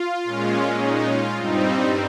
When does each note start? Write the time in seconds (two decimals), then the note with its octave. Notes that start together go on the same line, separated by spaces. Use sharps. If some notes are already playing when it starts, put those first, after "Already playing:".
Already playing: F4
0.24 A#2 G#3 C#4
0.79 D#4
1.07 F4
1.35 G2 G3 C4 D#4